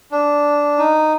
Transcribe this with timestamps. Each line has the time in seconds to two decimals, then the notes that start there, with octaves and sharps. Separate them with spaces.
0.12 D4
0.78 D#4